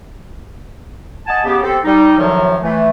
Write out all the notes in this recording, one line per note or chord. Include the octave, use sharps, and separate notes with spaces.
D#5 F#5 G#5 A5
C#3 B3 G4
C4 G4 A4
G3 D#4
F#2 A2 D#3 F3 F#3
E3 A3